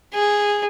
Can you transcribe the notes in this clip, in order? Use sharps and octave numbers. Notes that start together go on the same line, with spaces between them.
G#4